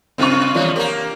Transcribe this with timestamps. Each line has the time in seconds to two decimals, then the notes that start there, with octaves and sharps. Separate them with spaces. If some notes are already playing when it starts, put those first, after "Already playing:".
0.18 G2 C3 C4 F4 C#6
0.54 D#2 G3 D4 F4 C#5
0.76 A#3 G4 A#4 C#5 A#5